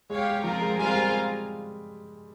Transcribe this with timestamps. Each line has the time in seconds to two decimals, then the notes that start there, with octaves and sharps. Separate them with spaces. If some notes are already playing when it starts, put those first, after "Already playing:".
0.10 G#3 G4 C#5 F5
0.30 G#3
0.44 F3 C4 F4 A#4
0.61 G#3
0.78 G3 C4 F4 A#4 F5 G#5
0.86 G#3
0.94 G3
1.03 G#3